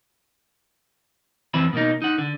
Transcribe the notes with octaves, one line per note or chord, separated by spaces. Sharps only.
F2 E3 C4 E5 B5
B2 A#3 D#4
D#4 F#5
D3